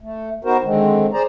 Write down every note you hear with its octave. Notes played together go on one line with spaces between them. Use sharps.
A3
B3 D#4 F#4 A#4 C5
D3 D#3 G#3 C4
G#4 C5 D5 A#5